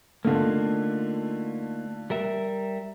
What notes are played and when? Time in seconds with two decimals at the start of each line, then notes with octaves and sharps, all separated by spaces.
0.25 D3 A3 A#3 D#4 F4
2.10 G3 A#4 E5